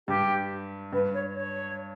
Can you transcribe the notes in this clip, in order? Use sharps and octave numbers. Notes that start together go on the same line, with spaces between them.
G2 G4
G2 B4
C#5
C#5